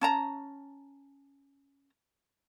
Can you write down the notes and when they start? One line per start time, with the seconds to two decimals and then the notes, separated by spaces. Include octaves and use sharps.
0.01 C#4 A5 A#5